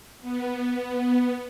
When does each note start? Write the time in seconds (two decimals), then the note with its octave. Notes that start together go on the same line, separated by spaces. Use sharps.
0.21 B3